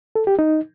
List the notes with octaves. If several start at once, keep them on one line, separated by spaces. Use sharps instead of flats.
A4
G4
D#4